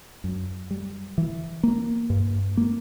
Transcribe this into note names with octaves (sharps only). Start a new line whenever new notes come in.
F#2
G3
E3
A#3
G2
A#3